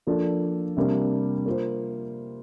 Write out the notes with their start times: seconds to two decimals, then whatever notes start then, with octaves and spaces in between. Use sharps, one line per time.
0.07 F3 A#3 D4 F4 A4
0.77 C3 G3 A#3 D4
1.46 A#3 F4 C5